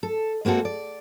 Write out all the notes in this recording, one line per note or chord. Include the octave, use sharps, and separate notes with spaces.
A4
G#3 A#3 C4 F#4 A4
D5